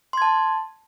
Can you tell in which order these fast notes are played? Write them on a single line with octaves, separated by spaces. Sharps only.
C6 G#6 A5